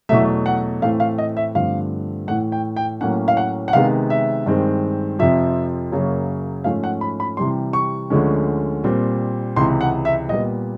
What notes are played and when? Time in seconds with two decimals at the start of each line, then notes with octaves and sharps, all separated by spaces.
0.09 E2 B2 F#3 A3 E5
0.46 F#5
0.82 A2 E3 A3 C4 F5
1.00 F5
1.18 D#5
1.37 E5
1.55 G2 D3 F3 A3 C4 F5
2.27 A2 E3 A3 F#5
2.52 G5
2.77 G5
3.01 A2 F#3 A#3 C#4 F#5
3.28 F5
3.37 F#5
3.68 F#5
3.73 C3 D#3 G#3 B3 F5
4.10 E5
4.46 G2 D#3 G#3 C4
5.19 F2 C3 F3 E5
5.92 F#2 C#3 F#3 A#3
6.64 G#2 F3 A3 C#4 F5
6.84 F#5
7.01 B5
7.20 B5
7.37 C3 E3 G3 C6
7.73 C#6
8.10 D2 D3 F3 G#3 C#4
8.84 A#2 G3 C4
9.56 C#2 C3 E3 C6
9.81 F#5
10.05 E5
10.28 A#2 G3 B3 D#5